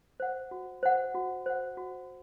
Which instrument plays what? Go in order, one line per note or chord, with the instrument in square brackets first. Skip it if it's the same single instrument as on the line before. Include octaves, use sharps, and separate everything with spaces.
[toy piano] C5 F#5
F#4
C5 F#5
F#4
C5 F#5
F#4